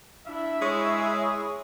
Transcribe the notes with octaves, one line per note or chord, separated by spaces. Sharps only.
D4 E4 E5
G#3 E4 G#4 C#5 C#6 D#6